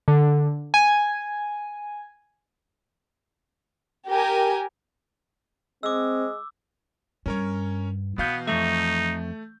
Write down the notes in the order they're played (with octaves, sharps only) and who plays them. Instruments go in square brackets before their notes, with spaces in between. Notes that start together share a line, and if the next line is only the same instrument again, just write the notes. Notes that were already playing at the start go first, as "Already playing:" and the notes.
[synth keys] D3
G#5
[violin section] G4 A#4 G#5
[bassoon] G#3 [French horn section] C4 [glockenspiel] D6 E6
[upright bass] G2 [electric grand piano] C#4 A#4 C#5
[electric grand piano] B2 F5 G6 [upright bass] E3 [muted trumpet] B3
[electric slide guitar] F2 G#3 E5 [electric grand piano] A3 C#6 [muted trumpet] D#4